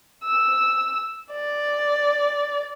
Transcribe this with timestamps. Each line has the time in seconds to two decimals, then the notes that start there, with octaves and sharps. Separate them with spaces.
0.25 E6
1.32 D5